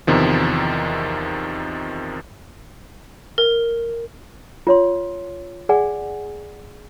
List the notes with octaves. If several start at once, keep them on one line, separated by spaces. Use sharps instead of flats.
E2 C3 D#3 F3
A#4
F4 C#5 C6
G#4 D5 F#5 G#5